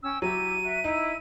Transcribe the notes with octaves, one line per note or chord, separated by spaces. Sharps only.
C#4 G5 E6
F#3 E4 G4 D#7
F#4 E5
D#4 E4